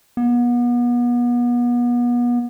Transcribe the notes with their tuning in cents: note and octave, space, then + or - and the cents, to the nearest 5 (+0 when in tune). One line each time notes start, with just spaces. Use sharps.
B3 -35